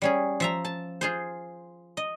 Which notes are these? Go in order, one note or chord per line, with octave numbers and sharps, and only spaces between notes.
G3 C#4 G#4
F3 E5 A#5
A5
F4 G#4 C5
D#5